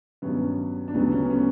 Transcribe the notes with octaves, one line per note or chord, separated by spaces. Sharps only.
G2 D#3 F#3 B3 C#4
D4
D2 C#3 F#3 B3 C#4
B3 C#4
B3 C#4